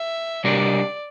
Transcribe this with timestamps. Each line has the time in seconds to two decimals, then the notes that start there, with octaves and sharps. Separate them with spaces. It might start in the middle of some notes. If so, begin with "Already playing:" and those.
Already playing: E5
0.44 C3 G3 D4 G4 A#4 D5